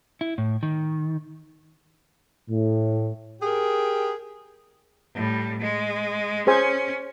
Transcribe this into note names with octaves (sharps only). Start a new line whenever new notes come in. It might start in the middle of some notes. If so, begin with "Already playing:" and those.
E4
A2
D#3
A2
G4 G#4 A#4
A2 G3
G#3
C#4 G#4 C5 G#5